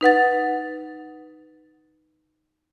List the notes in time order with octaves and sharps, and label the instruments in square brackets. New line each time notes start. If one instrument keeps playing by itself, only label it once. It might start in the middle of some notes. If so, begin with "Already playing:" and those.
[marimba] D#4 B4 F#5 A6